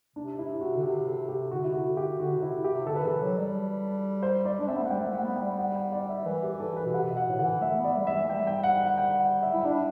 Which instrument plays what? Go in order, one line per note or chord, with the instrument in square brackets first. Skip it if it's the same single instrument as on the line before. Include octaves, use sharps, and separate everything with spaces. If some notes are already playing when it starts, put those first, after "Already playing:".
[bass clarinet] C3 [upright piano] D4
[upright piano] E4
F#4
[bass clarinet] D3
[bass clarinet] C3 [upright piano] G4
[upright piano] A4
G4
[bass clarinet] D3 [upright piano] F#4
[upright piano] E4
F#4
[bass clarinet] D3
[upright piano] G4
[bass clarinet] D3 [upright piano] F#4
[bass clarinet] C3
[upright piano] E4
G4
[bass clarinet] C3
[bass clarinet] D3 [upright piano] A4
[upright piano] B4
[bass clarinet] E3 [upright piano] A4
[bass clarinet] F#3
G3
[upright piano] C5
D5
[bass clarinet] D4
[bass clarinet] C4 [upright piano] E5
[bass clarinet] B3
A3
[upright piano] F#5
[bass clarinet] G3 [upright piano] G5
[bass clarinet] A3
[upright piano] F#5
[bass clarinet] B3
[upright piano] G5
[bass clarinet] G3
[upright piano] F#5
G5
D5
E5
[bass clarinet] E3 [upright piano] B4
[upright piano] G4
B4
A4
B4
[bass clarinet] B2
[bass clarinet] C3 [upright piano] F#5
[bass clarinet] B2
[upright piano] F#5
[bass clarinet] A2
[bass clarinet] D3 [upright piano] F#5
[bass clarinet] E3
[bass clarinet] A3 [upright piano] E5
[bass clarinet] B3
[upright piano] D5
[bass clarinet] G3
[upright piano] E5
[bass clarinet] E3
A3
[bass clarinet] G3 [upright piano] G5
[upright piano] G5
F#5
F#5
G5
F#5
E5
[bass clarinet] E4
[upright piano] E5
[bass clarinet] D4 [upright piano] D5